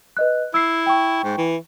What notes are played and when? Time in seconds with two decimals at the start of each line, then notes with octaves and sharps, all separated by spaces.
0.17 B4 D#5 F#6
0.54 E4 E6 C7
0.86 G5 C#6
1.24 G#2
1.38 E3